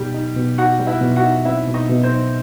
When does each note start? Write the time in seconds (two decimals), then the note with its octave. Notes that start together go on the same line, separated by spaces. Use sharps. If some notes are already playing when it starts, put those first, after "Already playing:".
Already playing: B2 G3 D#4 G4
0.14 D#4
0.36 B2
0.58 D#4 F#4 F#5
0.80 G3
0.87 E4 E5
1.01 B2
1.16 F#4 F#5
1.23 D#4
1.45 C4 E4 E5
1.67 B2
1.74 D#4 D#5
1.89 B2
2.03 C4 C5
2.11 D#4